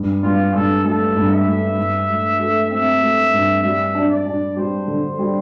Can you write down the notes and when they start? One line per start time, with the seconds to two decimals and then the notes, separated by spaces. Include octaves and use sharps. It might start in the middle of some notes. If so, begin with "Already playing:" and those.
Already playing: G2
0.23 G2 F4
0.54 G2 A4
0.84 A3 A4
1.16 G2
1.31 E5
1.47 A3
1.78 G2
2.09 A3
2.39 A3
2.70 C4 E5
3.02 A3
3.33 G2
3.63 G3 E5
3.95 D4
4.10 D5
4.26 D4
4.57 G3 C5
4.88 D3
5.19 G3